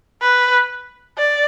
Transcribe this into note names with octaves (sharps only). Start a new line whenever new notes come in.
B4
D5